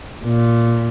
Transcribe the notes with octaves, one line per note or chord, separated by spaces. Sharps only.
A#2